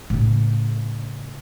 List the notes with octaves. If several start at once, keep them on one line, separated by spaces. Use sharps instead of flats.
A2 C#3